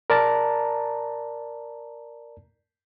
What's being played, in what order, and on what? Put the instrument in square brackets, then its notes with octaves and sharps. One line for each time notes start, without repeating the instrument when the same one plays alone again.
[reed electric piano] A#4 D5 A5 A#5